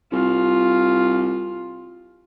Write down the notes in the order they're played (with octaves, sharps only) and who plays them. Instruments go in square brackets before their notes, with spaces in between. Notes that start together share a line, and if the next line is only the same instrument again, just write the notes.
[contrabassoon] C2 [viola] F4